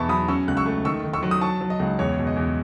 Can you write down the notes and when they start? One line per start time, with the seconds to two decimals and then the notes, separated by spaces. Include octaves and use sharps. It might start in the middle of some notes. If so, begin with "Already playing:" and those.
Already playing: E2 B2 B3 E5 A5 C#6
0.09 F#3 B5 D#6
0.28 C#4 C#6 E6
0.48 C#2 F#6
0.57 C#6 E6
0.66 A3
0.85 D#3 C#6 E6
1.04 D#3
1.14 C#6 E6
1.23 F#3
1.31 D#6
1.41 F#3 A5 C#6
1.61 F#3
1.70 D#5
1.80 C#2
1.99 E2 C#5
2.18 B2
2.27 D#5
2.36 E2